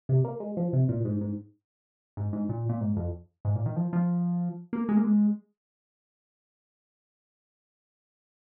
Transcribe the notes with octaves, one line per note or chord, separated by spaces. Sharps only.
C3
A#3
G#3
F3
C3
A#2
G#2
G#2
G#2
G#2
A#2
A#2
G#2
F2
G#2
A#2
D#3
F3
F3
A#3
G#3
A#3
G#3